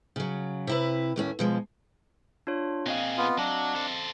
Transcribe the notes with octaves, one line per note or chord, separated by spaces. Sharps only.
C#3 F#3
C3 E4 B4
D#2 A2 C#4
B2 F3 G#3
D4 F4 C#5
A#2 C4 G#4 D#5 F5
B3 F4
F#3 D4
A4 C5